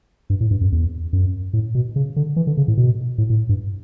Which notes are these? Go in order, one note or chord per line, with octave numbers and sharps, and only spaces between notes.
G2
A2
G2
F#2
E2
F#2
A2
B2
C#3
D3
E3
D3
C#3
A2
B2
A2
A2
G2